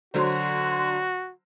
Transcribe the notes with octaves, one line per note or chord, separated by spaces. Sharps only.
D3 F#3 F#4 C5